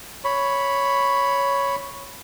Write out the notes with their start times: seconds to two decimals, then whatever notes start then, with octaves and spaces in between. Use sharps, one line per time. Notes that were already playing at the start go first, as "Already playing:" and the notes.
0.24 C#5 B5